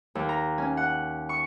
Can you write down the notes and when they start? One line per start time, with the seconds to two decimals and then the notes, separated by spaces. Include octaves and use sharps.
0.15 D#2
0.29 A#5
0.58 C#4
0.77 F#5
1.29 C#6